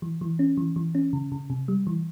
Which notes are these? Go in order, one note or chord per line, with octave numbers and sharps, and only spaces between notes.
E3
E3
C#4
E3
E3
C#4
C#3
C#3
C3
G3
E3